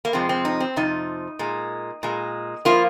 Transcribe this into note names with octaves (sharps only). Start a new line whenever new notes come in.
A#3
F2 C3 F3 G#3 C4
C4
D#4
C4
F2 C3 F3 D#4
A#2 G#3
A#2 G#3
F3 A#3 F4